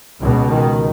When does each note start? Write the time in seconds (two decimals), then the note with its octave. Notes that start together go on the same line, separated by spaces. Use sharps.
0.20 C#2 B2
0.49 D#3